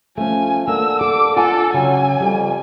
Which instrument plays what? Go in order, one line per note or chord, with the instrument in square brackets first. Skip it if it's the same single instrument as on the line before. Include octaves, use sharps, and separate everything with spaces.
[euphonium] F3 [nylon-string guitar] A3 C#4 [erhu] G#5
[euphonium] D3 [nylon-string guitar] A#3 [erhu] E6
[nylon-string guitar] A4 [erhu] D6
[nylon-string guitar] F4 F#5 G#5 [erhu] A4
[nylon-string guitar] C#3 [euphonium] F#3 [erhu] G#5
[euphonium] F2 [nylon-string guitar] G3